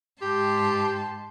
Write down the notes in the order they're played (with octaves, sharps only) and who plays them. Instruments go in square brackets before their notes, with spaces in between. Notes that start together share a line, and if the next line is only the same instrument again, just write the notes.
[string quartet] G#2 A5 C6 [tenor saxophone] G4